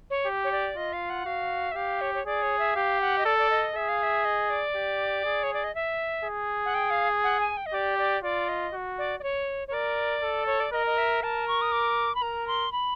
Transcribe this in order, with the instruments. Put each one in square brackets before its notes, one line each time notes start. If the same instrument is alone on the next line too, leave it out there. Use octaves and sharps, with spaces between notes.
[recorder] C#5
[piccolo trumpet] G4
[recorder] C#5
D5
[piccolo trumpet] F4 [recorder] D#5
[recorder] F5
F#5
[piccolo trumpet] F#4 [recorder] F5
[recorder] E5
[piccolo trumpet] G4 [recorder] F5
[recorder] C#5
C#5
[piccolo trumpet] G#4 [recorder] D5
[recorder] C#5
E5
[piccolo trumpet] G4 [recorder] F5
[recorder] F#5
D#5
[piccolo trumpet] A4 [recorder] D5
[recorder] D5
D#5
[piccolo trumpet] G#4 [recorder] E5
[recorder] F5
E5
D#5
D5
[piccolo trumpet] G4
G#4
[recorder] C#5
D5
D#5
E5
[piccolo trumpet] G#4
[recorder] F#5
G5
F5
F#5
G#5
G5
D#5
[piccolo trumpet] G4 [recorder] D5
[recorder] D5
[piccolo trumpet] F4 [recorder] D5
[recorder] D#5
[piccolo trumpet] F#4
[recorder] D5
D5
C#5
C#5
[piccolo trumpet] A#4 [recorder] D5
[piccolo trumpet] A4
[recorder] C#5
D5
[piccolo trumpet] A#4 [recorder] D#5
[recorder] D#5
E5
[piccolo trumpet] A#4 [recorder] A5
[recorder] C#6
D#6
D6
B5
[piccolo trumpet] A#4 [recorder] A#5
[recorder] C6
B5